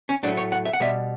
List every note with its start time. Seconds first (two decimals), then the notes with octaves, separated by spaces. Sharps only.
0.09 C#4
0.23 A2 F#3 A3 D4
0.37 C#5
0.52 F#5
0.65 E5
0.73 F#5
0.80 B2 G3 E5